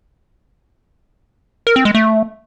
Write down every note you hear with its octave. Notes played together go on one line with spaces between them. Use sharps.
A#4
C4
G#3
A3